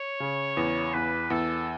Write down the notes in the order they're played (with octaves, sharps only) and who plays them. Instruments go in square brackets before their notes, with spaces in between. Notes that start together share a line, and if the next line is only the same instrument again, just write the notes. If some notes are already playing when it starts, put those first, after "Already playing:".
Already playing: [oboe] C#5
[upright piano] C#3
E2
[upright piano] E2 [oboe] B4
[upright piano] E2 [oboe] A4